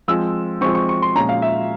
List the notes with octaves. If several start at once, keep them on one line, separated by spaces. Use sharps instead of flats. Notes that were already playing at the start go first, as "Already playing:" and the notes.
F3 G#3 C4 E6
F3 G#3 C4 C#6
C#6
C#6
C6
A#2 F3 G#3 C#4 A#5
F5
E5